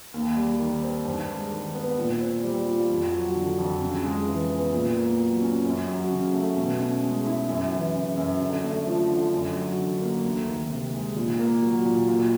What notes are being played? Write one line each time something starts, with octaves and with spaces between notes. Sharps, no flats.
D#2
G3
D#3
C4
G2
G#3
D#3
B3
A#2
C4
G3
F4
F2
F#3
D3
F2
C#3
G#3
E3
B3
A#2
A#3
F#3
C#4
F#2
F#3
C#3
A3
B2
C#4
G#3
E4
F#2
E3
C#3
F#2
D3
A3
F3
D3
F#2
F#3
D3
A#3
D2
D#3
C3
G#3
A#2
A#3
F#3
A#2
A#2